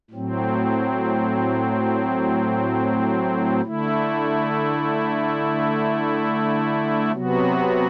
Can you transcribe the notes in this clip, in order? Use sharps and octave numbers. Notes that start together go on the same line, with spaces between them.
A2 F#3 C4
D3 A3 E4
C3 F#3 B3 F#4